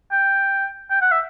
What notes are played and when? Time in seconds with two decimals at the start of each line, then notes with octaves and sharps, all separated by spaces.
0.12 G5
0.90 G5
1.02 F#5
1.12 E5